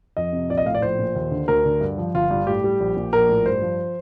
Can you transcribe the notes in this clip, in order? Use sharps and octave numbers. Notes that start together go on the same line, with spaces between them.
F2 D#5
C3
A#1 D5
D#5
A2 F5
D5
A#1 C5
A#2
D#2
D3
D2 A#4
D3
G2
F3
G1 F4
G2
A2 G4
G3
A#1
A#2
A#1 A#4
A2
G2 C5
F3